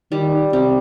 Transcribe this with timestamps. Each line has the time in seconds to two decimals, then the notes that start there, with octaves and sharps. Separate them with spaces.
0.12 D#3 G3
0.53 C3 G3